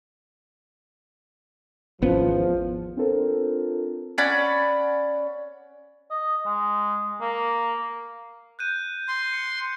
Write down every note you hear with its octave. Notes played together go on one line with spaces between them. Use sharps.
G#1 E2 F3 B3 C#4
C4 D4 F4 A4 A#4 C5
C#4 D5 F#5 B5
D#5
G#3
A#3
F#6 G6 D#7
C6
C#7